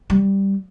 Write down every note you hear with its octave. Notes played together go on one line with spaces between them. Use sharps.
G3